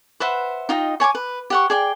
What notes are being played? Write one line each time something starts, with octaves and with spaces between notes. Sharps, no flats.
B4 C5 E5 F#5
D#4 F4 D#5 G5
C#5 G#5 B5 D6
B4
G4 F#5 C#6
G#4 D5 G5